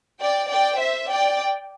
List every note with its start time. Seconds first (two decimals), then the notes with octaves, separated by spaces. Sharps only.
0.20 D5 G5
0.50 D5 G5
0.78 C5 E5
1.09 D5 G5